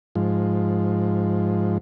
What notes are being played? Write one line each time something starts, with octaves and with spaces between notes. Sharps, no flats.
G#2 F3